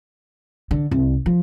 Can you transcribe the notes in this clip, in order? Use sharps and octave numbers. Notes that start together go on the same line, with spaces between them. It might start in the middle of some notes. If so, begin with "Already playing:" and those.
D3
C2
F3